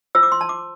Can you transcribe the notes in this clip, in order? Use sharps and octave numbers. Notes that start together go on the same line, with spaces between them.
F4 C5 E6
D6
C6
A5
D6